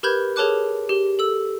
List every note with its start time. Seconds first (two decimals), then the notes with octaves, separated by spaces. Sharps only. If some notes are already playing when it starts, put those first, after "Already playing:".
0.03 G4 A#4 B4 B5 G6 G#6
0.36 G#4 A#4 C#5 A5 D6 F#6
0.89 G4 G7
1.19 A4 E6